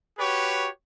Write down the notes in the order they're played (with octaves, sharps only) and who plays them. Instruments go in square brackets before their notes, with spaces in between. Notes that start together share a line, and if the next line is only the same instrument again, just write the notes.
[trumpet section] F#4 G4 B4 C#5